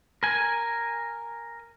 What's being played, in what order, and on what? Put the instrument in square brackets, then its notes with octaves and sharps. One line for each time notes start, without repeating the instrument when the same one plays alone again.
[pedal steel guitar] A#4 G#5